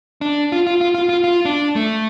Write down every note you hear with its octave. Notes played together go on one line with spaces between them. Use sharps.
D4
F4
F4
F4
F4
F4
F4
D4
A3